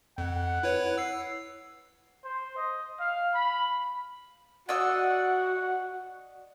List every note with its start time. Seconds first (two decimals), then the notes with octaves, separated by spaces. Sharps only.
0.18 F2 F#5
0.63 E4 B4 C#5
0.98 E6 C7
2.24 C5
2.56 D#5
3.00 F5
3.34 B5
4.69 F#4 D5 D#5 F#5 E6